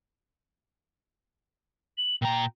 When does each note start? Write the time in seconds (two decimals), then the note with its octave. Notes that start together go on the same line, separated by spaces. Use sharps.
1.97 F#7
2.22 A#2 G5 A#5